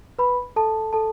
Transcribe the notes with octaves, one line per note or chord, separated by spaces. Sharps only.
B4 B5
A4 A5
A4 A5